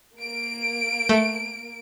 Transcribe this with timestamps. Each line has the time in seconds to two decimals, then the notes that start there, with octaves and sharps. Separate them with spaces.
0.18 A#3 D7
1.09 A3